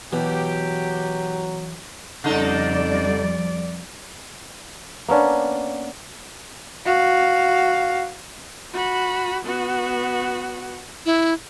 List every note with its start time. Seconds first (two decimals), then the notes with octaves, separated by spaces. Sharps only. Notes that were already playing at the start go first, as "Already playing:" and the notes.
0.13 B2 E3 F#3 G4
2.24 F2 C#3 G3 D#4 A4 D5
5.08 A#3 B3 C#4 D4
6.85 F#4 F5
8.73 F#4 B5
9.45 B3 F#4
11.06 E4